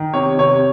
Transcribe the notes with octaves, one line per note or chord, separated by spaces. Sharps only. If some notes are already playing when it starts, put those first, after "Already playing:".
Already playing: D#3
C3 C#5
C3 C#5